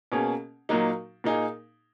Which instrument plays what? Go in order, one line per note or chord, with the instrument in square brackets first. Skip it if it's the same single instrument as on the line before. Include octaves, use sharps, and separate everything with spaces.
[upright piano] B2 A#3 C#4 G#4
A#2 F#3 A#3 D#4
A#2 A#3 D#4 G#4